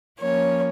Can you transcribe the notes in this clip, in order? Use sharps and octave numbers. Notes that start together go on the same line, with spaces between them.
F3 A#3 C#4 C#5